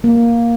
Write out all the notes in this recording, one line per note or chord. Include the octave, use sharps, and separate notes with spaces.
A#3